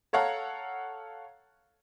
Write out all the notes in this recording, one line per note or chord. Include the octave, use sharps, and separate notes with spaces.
A4 C#5 F5 F#5 A#5